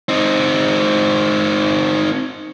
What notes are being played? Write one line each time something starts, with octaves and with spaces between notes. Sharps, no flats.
C4 D#4